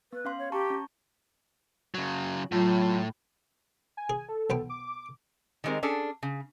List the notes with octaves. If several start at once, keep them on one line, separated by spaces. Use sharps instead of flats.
B3 B4
C#4 F5 C6
C#5
G4 A5 A#5 C#6
C#4
C#3 F#3
A2 F#3 F4
G#5
G#4
A4
B1 B3 G5
D6
D#3 G3 G#3 C4 A#4
C#4 D4 G#4 A4
C#3